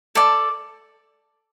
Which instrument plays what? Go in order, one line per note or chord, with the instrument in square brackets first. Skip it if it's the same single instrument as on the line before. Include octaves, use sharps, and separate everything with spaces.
[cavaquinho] A4 D5 A5